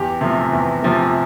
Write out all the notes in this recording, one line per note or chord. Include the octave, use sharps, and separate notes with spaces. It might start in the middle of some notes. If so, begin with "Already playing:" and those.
Already playing: E2 G4
C3 F3 A3
E2
C3 F3 A3